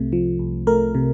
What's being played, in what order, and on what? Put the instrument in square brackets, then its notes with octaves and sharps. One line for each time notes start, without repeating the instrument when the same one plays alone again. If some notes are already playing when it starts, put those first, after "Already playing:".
Already playing: [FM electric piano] C2 C3 A3
F3
C2
A3 A#4
C3